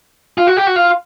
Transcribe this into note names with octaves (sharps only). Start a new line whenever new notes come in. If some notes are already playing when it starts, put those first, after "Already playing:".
F4
F#4
G4
F#4
F4